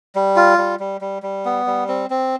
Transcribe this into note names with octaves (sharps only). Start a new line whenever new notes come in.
G3
F4
G3
G3
G3
G3
B3
G3
C4
C4